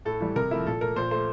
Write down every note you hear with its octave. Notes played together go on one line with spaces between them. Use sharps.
A2 A4
E3 G3
C3 A#4
F3 A3 E4
A#2 A4
A3 A#4
A#2 C5
A3 C5